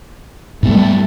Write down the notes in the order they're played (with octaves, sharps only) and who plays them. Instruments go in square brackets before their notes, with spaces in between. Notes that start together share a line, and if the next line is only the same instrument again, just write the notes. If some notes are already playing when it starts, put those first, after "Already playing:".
[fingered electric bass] G#2 B3 [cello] G3 A3